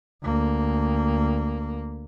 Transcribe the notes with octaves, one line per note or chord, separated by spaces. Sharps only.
D2 A#3